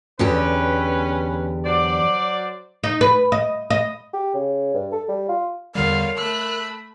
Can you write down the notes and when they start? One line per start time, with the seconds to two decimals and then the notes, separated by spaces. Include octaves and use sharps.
0.19 E2 D3 C#4 G4 B4
1.66 F#3 C5 D5
2.84 D#4
3.01 B4
3.32 D#5
3.70 D#5
4.13 G4
4.34 C#3
4.74 G2
4.92 A4
5.08 G3
5.29 F4
5.75 E2 D3 G3 F4 A#4 C#5 F5
6.18 A3 B5 E6 F#6